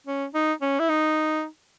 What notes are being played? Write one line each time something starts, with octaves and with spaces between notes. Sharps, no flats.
C#4
D#4
C#4
E4
D#4